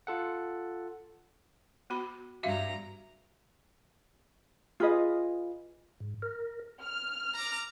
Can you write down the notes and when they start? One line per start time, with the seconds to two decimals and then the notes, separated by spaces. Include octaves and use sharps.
0.07 F4 A4 F#5
1.90 B3 F#4 B5
2.43 G2 F#4 E5 F5 A#5
4.80 F4 G#4 B4 D#5
6.00 G#2
6.22 A#4
6.82 F6
7.34 A#5 D6